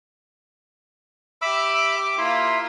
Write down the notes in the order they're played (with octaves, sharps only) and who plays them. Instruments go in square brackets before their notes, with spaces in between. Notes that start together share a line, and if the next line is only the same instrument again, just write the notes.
[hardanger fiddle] G4 D6 [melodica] E5 B5 E6
[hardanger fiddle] A#3 F4 [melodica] E4 E5 C6